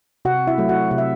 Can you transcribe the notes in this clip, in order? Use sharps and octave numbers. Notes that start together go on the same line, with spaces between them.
C3 F#4 F#5
E4 E5
F#3 A3
F#4 F#5
C3 F#5
E5